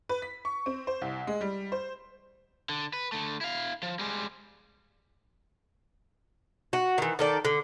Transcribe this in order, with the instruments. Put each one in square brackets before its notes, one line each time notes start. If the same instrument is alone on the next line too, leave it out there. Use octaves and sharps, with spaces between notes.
[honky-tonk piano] B4
B6
C#6
C4
C5
C2
G#3
G3
C5
[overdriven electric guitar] D3
B4
D3 A3
E4 F5
F3
G3 G#3
[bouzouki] F#4
D#3 E3
D#3 A4 D5
D3